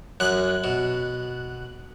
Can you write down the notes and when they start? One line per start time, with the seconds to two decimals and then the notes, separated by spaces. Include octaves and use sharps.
0.20 F#2 F#6
0.64 B2